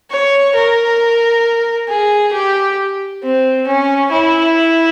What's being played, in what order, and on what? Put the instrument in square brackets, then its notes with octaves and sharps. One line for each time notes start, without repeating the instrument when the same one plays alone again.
[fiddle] C#5
A#4
G#4
G4
C4
C#4
E4